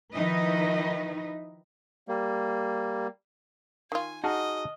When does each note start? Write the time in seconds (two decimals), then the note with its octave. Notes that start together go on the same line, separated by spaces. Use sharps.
0.13 D#3 F3 D#4 E4 B4 D#5
2.08 G3 A#3
3.92 D#3 F4 G#5
4.24 D#4 F#4 G#4 D#5 F#5 A5 F6